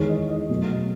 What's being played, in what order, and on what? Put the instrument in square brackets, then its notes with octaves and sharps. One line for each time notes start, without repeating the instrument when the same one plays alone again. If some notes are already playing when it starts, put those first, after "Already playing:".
Already playing: [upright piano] E2 D#3 G#3 C#5
D#5
D#5
B2 F#3 A3